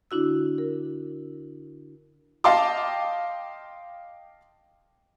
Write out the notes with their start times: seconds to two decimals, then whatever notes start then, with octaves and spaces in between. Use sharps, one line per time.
0.11 D3 D4 E4 F#4 E6
0.58 A#4
2.44 D#5 F5 G5 A5 C6 D6